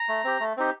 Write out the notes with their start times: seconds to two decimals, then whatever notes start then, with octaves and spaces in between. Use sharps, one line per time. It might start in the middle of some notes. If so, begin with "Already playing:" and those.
Already playing: A#5
0.09 A3
0.24 C4 G4
0.40 A3
0.57 C4 D#4 G4